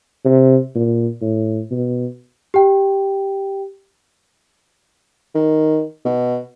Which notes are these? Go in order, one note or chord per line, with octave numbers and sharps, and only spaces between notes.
C3
A#2
A2
B2
G4 G5
D#3
B2